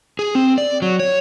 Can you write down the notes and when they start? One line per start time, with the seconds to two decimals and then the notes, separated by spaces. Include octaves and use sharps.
0.19 G#4
0.35 C4
0.58 D5
0.82 F#3
0.99 C#5